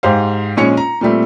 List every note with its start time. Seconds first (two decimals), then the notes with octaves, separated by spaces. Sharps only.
0.03 G#2 G4 C5 F5
0.57 A#1 G#3 C#4 C#5 C#7
0.77 A#5
1.01 A#2 G3 A3 C4